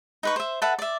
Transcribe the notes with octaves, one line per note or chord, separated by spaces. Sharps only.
D#4 B4 C#6
C5 E5
A4 B4 E5 F#5
D5 E5